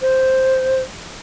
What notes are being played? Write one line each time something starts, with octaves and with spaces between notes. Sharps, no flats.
C5